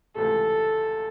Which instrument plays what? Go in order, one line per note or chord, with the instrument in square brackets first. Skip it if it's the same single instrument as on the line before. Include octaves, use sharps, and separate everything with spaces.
[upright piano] C#2 C3 E3 A3 [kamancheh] A4